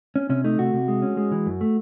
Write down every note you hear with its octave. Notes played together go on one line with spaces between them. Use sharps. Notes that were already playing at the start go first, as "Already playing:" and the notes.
C#4
C3 C#4
A3 D#4
C3 F#4
C3
G#3
C#4
G#3
E3
F#2
A3